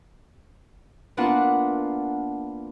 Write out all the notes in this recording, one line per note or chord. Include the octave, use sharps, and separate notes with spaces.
A#3 B3 D4 F4 F#5